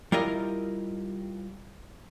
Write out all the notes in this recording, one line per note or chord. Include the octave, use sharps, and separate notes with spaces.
G3 E4 F4 A#4 D#5